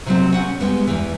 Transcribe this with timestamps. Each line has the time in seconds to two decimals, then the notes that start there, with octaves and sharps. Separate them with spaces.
0.06 C3 F#3 C4
0.32 C#4 F#5
0.60 G3 G#3 B3
0.88 E2 E3